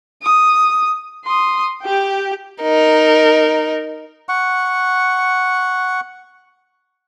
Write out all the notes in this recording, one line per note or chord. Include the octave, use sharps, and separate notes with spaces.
D#6
C6 D#6
G4 G5
D#4 A#4
F#5 C#6